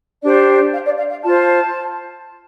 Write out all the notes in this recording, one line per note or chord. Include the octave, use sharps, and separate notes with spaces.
D4 G4 C5 D5
F5
D5
F5
F5
F4 C5 A5